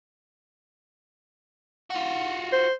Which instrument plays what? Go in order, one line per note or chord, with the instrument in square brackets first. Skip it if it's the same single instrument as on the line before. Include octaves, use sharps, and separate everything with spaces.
[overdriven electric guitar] F4 F#4
[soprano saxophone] C5